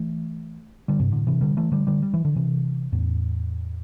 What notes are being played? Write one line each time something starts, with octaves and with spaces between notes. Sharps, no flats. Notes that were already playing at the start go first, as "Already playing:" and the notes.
Already playing: E3 A3
D3 G3
G2 C3
A2 D3
C3 E3
D3 G3
E3 A3
D3 G3
D3 G3
G3
E3
D3
C3 E3
E2 A2